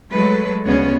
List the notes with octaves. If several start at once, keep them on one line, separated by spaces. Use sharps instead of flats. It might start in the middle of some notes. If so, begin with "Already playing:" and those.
F#3 G#3 A3 A4 B4
D2 C#3 G#3 B3 C#4 C#5